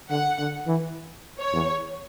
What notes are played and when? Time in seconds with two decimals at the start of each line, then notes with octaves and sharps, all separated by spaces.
0.10 D3 F#5
0.38 D3
0.67 E3
1.38 C#5
1.53 E2